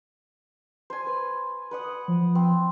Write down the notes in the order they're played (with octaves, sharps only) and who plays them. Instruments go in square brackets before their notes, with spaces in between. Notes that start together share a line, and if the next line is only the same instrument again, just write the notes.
[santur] C5 G#5
B4
B4 F#5 D#6
[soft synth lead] F3
[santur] C4